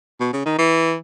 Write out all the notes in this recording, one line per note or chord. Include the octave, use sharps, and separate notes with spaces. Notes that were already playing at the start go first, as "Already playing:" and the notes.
B2
C#3
D#3
E3